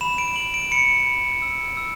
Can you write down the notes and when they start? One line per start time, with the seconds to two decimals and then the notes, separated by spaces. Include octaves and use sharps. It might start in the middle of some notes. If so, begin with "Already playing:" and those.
0.01 B5 E7
0.18 D7
0.36 B5 F#7
0.54 D7
0.71 B5 C#7
1.07 B5
1.42 E6
1.77 E6